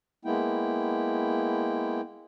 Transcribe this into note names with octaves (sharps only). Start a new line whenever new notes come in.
G#3 A#3 B3 E4 G5